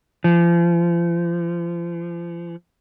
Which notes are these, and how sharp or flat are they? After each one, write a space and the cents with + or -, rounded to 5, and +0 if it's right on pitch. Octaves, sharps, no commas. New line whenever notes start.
F3 -35